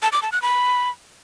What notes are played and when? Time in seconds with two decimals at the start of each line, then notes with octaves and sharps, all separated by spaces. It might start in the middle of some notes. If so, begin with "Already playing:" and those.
0.02 A5
0.12 D6
0.22 A5
0.32 F#6
0.42 B5